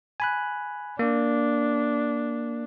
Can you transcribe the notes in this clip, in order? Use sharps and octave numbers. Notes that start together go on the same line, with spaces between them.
G#5 B5 F#6
A#3 D4